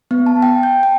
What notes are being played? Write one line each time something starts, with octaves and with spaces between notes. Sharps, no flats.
B3
A5
G5
G6
G5